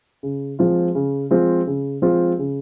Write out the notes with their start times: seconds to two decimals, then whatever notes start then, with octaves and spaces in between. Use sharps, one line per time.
0.23 C#3
0.59 F3 G#3 C4 F4
0.95 C#3
1.31 F3 G#3 C4 F4
1.67 C#3
2.02 F3 G#3 C4 F4
2.39 C#3